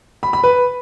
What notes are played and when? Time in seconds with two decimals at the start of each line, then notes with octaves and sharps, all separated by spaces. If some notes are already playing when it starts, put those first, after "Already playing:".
0.23 B5
0.33 B5
0.44 B4